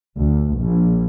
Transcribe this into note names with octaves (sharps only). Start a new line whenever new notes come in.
D2
A#1